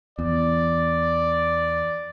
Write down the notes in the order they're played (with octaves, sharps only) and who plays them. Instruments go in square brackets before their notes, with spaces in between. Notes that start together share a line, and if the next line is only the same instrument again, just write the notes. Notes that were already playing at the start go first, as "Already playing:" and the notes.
[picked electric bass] E2 [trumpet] D5